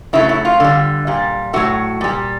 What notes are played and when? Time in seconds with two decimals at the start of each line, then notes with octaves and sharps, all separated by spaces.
0.13 C#3 F#3 A3 E4
0.29 E4
0.45 F4
0.60 D3 G3
1.07 A#2 G3
1.53 A2 F#3 A3 F#4
2.01 A#2 G3